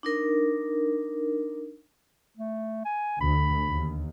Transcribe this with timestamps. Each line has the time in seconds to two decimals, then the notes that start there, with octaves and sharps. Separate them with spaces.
0.03 D4 D#4 A#4
2.37 A3
2.85 G#5
3.20 D2 B5
3.68 D#2